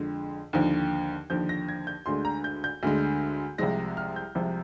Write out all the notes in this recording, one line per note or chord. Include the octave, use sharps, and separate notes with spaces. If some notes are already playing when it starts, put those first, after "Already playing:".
Already playing: F2 D3 G#3
D#2 D3 F3
D#2 D3 F3 G6
A#6
G#6
G6
D2 D3 G#3 C6
A#5
G6
G6
D2 D3 G#3
C2 C3 F3 G#3 A#6
F6
G6
C2 C3 F3 G#3